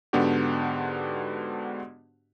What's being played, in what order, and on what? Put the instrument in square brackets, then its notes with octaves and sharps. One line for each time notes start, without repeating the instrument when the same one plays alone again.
[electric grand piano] G#2 D3 B3 D4 F#4 G4